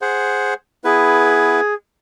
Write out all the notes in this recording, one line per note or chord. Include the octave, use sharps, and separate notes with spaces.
G#4 C5 F#5
B3 E4 G#4 B4